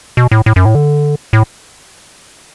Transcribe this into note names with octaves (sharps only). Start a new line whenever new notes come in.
B2
A2
A2
F#2
A2
D3
A2